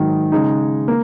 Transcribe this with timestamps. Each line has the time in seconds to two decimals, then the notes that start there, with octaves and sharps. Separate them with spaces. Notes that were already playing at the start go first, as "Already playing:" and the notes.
Already playing: G#2 D#3 F#3
0.32 C#3 G#3 D#4
0.88 A#3